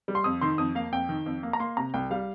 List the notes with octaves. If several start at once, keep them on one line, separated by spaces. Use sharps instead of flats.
G3
C6
F2 D#6
D#3 C6
F2 D#6
A#3 F5
F2 G5
D#3
F2
A#3
A#5
A#3 C6
C3 A#5
C2 G5
G3 F5